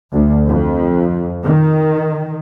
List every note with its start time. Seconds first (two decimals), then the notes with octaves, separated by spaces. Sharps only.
0.12 D2
0.47 F2
1.44 D#3